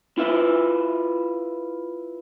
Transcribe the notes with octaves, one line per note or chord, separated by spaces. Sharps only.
E4 F4 B4 E5